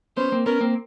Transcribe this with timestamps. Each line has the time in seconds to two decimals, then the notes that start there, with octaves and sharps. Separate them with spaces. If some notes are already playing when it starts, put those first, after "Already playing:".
0.17 B3 C#4 C5
0.32 A#3 C4
0.46 B3 C#4 A#4
0.60 A#3 C4